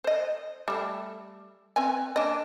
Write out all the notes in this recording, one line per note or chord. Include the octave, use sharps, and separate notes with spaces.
C5 D#5
G3 A3
C4 B4 G#5
A#3 D4 D#5